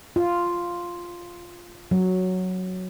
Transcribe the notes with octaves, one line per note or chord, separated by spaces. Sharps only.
F4
F#3